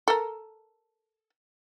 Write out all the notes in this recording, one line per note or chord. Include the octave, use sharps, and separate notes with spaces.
A4 A#4